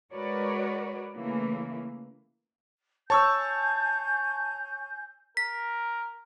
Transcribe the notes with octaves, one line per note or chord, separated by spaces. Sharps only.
G#3 F#4 A#4 B4 C#5 D5
C#3 E3 A3 A#3
C#5 G#5 A5 C#6 E6 G6
A#4 B6